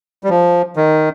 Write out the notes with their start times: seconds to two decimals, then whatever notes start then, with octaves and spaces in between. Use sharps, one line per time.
0.24 G3
0.29 F3
0.76 D#3